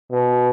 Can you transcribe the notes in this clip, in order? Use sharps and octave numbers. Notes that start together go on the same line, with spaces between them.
B2